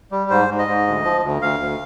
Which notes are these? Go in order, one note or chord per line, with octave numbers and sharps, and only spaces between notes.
G3
G#2 C5
G#2
D#5
G#2
D2
F3
D2
D2 F5
D2